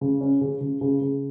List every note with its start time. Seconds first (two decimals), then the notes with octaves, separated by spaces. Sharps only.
0.01 C#3
0.21 C#4
0.41 C#3
0.61 C#3
0.81 C#3
1.01 C#3